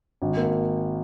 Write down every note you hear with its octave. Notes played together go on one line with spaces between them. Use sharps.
G#1
A#3